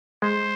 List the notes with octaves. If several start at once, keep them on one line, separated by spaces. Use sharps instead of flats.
G#3 C5